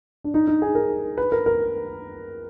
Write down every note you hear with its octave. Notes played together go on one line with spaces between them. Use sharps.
D4
D#4
D#4
G#4
A#4
B4
A#4
A#4